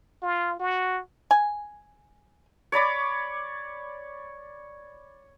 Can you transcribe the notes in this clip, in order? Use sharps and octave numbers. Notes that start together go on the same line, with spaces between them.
F4
F#4
G#5
C#5 D5 B5 D6